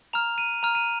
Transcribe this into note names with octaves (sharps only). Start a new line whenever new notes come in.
A#5 F6 F7
D#7
A#5 F6 F7
D#7